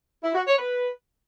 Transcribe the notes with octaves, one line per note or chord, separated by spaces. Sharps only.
E4
F#4
C#5
B4